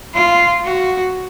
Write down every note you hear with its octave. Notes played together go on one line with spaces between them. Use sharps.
F4
F#4